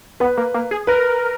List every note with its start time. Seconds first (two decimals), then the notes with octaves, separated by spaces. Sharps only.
0.20 B3 B4
0.37 A#3
0.54 A#3
0.71 G#4
0.87 A#4 B4